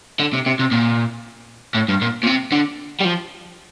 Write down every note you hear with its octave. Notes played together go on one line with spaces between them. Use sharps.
D3
C3
C3
C3
A#2
A2
G2
A#2
A#2
C3
D3
G3
F3